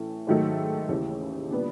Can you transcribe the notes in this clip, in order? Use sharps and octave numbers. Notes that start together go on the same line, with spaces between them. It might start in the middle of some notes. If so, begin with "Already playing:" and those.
Already playing: A2 E3 C#4 E4
G#2 D#3 F#3 A3
D#2 C#3 E3
A#2 G3 B3 D4